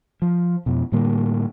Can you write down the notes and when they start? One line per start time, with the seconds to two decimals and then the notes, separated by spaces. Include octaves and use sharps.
0.22 F3
0.66 F2 B2
0.92 A2 D3 G3 A#3